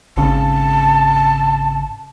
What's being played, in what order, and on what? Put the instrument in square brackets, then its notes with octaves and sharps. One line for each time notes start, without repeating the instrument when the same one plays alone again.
[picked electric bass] G#1 C#3 [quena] A5